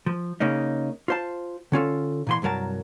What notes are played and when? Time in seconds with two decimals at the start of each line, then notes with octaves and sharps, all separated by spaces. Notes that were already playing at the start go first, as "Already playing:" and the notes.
0.06 F3
0.40 C#3 A#3 C#4 D#4
1.08 F4 C5 A5
1.72 D3 C#4 F4 A4
2.27 A#2 E3 C6
2.42 C2 G2 F#3 A#4 A5